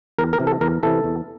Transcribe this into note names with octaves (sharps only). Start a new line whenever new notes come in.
E2 A#4
A#4
C3 E3
A4
E2 A#4
C3 E3 A4
E2